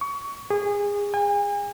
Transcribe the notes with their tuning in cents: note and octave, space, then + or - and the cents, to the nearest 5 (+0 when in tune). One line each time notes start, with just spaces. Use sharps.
C#6 +25
G#4 -25
G#5 -40